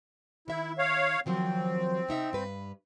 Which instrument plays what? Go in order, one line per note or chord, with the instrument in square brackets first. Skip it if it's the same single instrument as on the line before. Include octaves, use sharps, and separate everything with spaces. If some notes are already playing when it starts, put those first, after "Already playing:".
[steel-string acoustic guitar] D#3 E5 [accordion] E4
[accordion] C#5 F5
[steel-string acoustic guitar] D#3 F3 F#3 [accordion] C4
[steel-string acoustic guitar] C3 D#4 E5
G2 B4